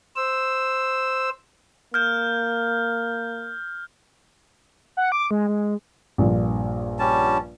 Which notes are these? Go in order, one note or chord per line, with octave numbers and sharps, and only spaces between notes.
C5 E6
A#3 F6 G6
F#5
D6
G#3
G#3
A#1 G2 A#2
G3 C#4 A5